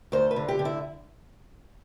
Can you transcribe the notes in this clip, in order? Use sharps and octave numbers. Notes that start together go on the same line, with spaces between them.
D2 C5
B4
D3
G4
D3
E4